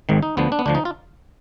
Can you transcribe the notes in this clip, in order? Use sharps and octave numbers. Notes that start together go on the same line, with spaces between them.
G#1 G#2 D#3
D#4
D2 D3 F3 B3
D4
B3
D2 D3 F3 D4
D#4
F4